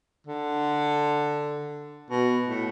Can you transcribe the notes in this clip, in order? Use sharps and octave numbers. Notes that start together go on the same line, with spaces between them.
D3
B2
A2